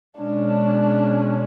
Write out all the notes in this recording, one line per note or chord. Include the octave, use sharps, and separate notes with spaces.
B2 G#3 C#4 D4